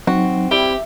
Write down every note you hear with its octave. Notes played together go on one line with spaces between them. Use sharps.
F#3 C4 D#4 F#4
G3 E4 G4 E5